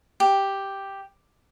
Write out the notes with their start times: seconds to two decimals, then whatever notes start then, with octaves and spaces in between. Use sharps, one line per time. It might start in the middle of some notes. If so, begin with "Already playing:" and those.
0.20 G4